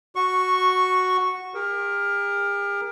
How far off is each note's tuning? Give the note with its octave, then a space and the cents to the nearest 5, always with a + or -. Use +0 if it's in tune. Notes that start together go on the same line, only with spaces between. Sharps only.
F#4 +0 C#6 -10
G4 +45 A#4 +10